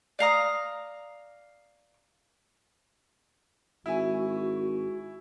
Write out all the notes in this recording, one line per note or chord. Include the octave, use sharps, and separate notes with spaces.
D5 F5 A#5 D#6
G#1 E4 F#4 G#5